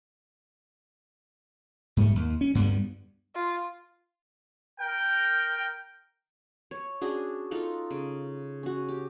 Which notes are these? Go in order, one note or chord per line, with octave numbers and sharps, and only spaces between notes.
G#2 G3 A3
D#2
C#4
D2 G2 G3 B3
F4
A#4 G5
C#5
C#4 D4 F#4 G#4
D#4 F4 A4 F#5
C#3
C#4 F#4
G4